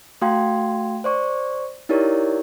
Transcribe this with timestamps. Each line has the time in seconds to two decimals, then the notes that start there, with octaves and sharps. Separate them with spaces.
0.21 A3 F#4 F5 G5 C6 G#6
1.04 C5 D5 C#6
1.89 D#4 E4 G4 A#4 C#5 D5